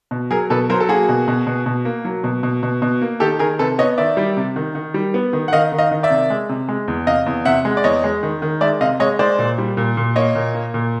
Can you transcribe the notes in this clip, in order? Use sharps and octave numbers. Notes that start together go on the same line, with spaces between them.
B2
F#3 G#4 A#4
B2 A4 B4
F#3 A#4 C5
A4
A#3 F#4 G#4
B2
B2
B2
B2
A#3
F#3
B2
B2
B2
B2
A#3
D#3 G4 A4
D#3 G#4 A#4
C3 A4 B4
B3 C#5 D#5
D#3 D5 E5
G3
C3
D#3
D#3
G3
B3
D#3
F#5
D#3 D#5 F5
D#3
D#5 F5
D#3
D5 E5
C3
G#3
C3
G#3
E2
C3 D#5 F5
E2
C3 E5 F#5
G#3
D5
E2 C#5 D#5
G#3
D#3
D#3
G#3 D5 E5
C3 D#5 F5
G#3 C#5 D#5
G#3 C5 D5
A#2
G3
A#2
A#2
A#3 C#5 D#5
A#2
A#3
A#2